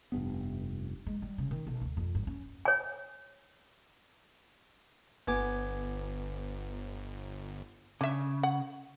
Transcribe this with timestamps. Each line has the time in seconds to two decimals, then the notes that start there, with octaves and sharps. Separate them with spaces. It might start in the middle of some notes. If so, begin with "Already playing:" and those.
0.12 F1 G2 B3
1.07 G#3
1.22 G3
1.38 C#3
1.51 D#3
1.67 B1
1.82 D2
1.97 F2
2.15 G2
2.27 C#4
2.65 C#5 G#5
5.28 G1 B3 G#5 D6
8.01 C#3 D4 E5
8.43 F#5